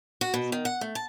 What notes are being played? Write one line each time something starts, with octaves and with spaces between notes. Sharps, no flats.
F#4
B2
D#3
F#5
A3
A5